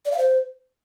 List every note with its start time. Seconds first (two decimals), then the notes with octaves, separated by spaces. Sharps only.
0.05 D5
0.12 F5
0.18 C5